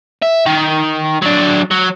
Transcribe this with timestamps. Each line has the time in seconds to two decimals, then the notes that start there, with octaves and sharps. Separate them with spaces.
0.23 E5
0.46 D#3
1.22 F#3 D4
1.71 F#3